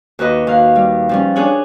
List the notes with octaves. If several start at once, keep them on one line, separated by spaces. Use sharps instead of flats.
D#2 F#4 B4 D#5
D#2 F5 F#5
G3
F3 G3 C#4
D4 G#4 C#5 G#5 F#6